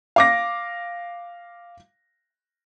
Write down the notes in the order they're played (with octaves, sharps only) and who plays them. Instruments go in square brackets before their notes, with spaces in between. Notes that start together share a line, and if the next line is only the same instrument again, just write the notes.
[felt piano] F5 D6 A#6